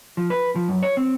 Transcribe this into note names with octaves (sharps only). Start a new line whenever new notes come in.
F3
B4
F3
F#2
C#5
C4